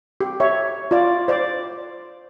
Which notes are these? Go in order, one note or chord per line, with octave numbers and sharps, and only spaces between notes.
G4
C#5 E5
F4 D5
C5 D5